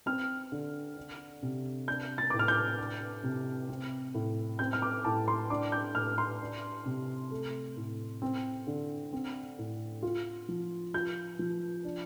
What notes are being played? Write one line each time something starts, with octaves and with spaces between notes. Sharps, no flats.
C4 F6
D3
D4
C3
D4 G6
A6
A2 D6
F6
G6
D4
C3
C4
A2
C4 G6
F6
D6
A2 A5
C6
D4 D6
G6
A2 F6
C6
D4
C3
A3
A2
C4
D3
C4
A2
F4
F3
F4 G6
F3
D4